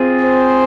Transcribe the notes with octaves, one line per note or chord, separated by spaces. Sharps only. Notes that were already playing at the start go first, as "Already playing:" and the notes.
Already playing: C4 F4 G#4
C5